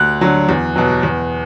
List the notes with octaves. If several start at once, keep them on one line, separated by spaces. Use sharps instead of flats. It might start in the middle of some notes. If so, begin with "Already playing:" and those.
Already playing: D2 F#6
D3 F#3
E2
B2 F#3
E2